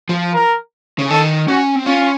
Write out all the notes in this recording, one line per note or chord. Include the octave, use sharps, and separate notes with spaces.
F3
A#4
C#3
D#3 A4
C#4 F#4
C4
C#4 F4